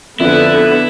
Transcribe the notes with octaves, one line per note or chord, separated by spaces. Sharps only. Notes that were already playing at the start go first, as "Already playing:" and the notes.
F2 D3 B3 E4 B4